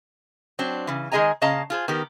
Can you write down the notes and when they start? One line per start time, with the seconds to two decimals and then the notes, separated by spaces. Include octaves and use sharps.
0.59 F#3 C4 D4
0.87 C#3 E3
1.12 D#3 G#3 G#4 D#5 G#5 A#5
1.41 A#2 C#3 D#5 F5 A5 A#5
1.70 F4 G#4 C5
1.88 D#3 B3 G4 A#4